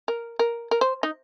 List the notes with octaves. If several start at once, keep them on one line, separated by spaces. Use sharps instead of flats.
A#4
A#4
A#4
C5
D#4